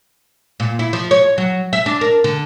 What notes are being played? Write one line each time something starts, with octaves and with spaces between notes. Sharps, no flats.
A#2
E4
F3
C#5
F#3
E5
D4
A#4
D3